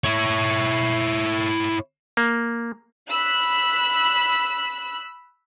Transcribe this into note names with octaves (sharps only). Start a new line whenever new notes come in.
E4 C#5
A#3
B5 E6 F#6